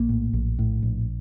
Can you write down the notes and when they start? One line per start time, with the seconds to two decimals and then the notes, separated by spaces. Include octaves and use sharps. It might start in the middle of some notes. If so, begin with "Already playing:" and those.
Already playing: A#1 A#3
0.09 A2
0.33 A#1
0.59 A2
0.83 A#1